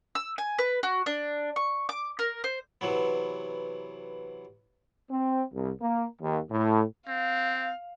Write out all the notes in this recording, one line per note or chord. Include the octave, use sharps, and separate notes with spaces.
E6
G#5
B4
F#4
D4
C#6
D6
A#4
C5
C3 E3 F#3 B3
C4
C2
A#3
D#2
A2
C4 F5